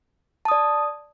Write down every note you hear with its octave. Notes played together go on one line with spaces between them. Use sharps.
D5 A5 D#6